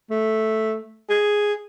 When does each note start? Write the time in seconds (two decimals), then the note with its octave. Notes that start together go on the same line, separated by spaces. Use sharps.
0.10 A3
1.10 G#4